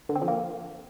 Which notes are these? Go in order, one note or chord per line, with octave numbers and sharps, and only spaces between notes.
D3
C4
F3
A#3